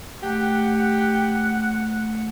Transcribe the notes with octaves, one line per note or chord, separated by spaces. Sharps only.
A3 G4 F#5